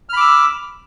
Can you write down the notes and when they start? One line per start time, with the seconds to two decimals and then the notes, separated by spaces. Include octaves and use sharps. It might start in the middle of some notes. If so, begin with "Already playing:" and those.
0.09 F6
0.13 B5
0.17 D6
0.20 E6